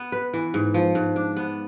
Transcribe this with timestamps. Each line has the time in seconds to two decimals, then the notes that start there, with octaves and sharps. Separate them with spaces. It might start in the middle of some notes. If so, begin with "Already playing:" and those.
Already playing: B3
0.12 B4
0.34 E3
0.54 G#2
0.74 F3
0.95 G#2
1.16 D4
1.37 B3